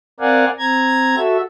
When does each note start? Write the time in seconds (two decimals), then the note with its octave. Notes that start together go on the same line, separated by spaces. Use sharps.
0.20 C4 A#4 D5 F5 F#5 G#5
0.59 C4 A#5 G#6
1.16 F#4 A4 E5